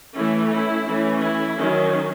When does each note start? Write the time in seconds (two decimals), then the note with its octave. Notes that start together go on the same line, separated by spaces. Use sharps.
0.15 E3 A3 C#4 E4
0.50 E4
0.86 E3 A3 C#4
1.22 E4
1.58 D#3 F#3 C#4